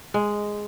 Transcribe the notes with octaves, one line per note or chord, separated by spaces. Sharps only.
G#3